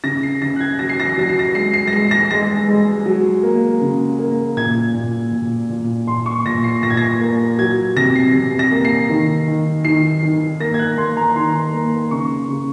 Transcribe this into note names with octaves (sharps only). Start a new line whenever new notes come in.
C#3 A#6
C7
C#3 A#6
F#6
G#6
F#3 A#6
C7
A#6
C7
F#3 A#6
C7
A#6
G#3 C7
C7
A#6
G#3 C7
A#6
G#3 A#6
G#3
F#3
A#3
C#3
A#3
A#2 G#6
A#2
A#2
A#2
A#2 C6
C#6
A#2 A#6
C7
A#2 A#6
G#6
A#6
A#3
F#3 G#6
C3 A#6
C7
C3
A#6
A#3
C7
D#3
D#3
D#3 C7
D#3
A#3 A#6
G#6
F#6
A#3 C6
A#5
D#3 C6
A#3
C#3 C#6
C#3